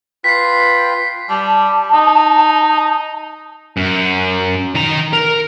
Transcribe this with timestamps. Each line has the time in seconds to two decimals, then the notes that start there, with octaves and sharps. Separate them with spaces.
0.24 F4 B4 G5 B6 C7
1.30 G3 A5
1.93 D#4
3.77 F#2
4.75 D#3 A#5
5.13 A#4